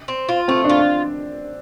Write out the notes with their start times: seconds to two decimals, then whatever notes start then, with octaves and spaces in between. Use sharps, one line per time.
0.08 C4
0.29 F4
0.48 A3 C4
0.64 D4
0.69 F4
0.79 D4